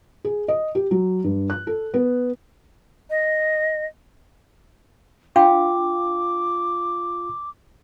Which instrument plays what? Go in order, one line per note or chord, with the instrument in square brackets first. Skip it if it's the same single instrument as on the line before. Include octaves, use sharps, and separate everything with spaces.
[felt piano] G#4
D#5
G4
F#3
G2
F#6
A4
B3
[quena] D#5
[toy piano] D4 F5 G5 [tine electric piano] F4 [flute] D6